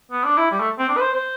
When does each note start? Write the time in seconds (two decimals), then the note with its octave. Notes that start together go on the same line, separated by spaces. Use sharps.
0.12 B3
0.24 D4
0.38 E4
0.51 G3
0.60 A3
0.79 C4
0.89 D4
0.97 B4
1.01 C5
1.14 C5